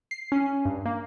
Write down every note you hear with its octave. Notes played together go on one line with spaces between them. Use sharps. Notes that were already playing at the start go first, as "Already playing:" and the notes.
C7
C#4
G2
A#3